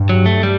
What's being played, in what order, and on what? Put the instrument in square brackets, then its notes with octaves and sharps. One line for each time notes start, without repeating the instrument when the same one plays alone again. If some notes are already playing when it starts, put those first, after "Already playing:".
Already playing: [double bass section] G2
[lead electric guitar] F#3
A3
G3